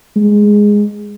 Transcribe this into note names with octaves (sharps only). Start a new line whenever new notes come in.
G#3